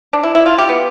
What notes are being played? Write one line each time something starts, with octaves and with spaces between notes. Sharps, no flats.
D4
E4
E4
F4
G4
B3